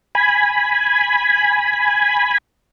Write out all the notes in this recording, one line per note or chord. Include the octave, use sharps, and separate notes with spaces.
G#5 B5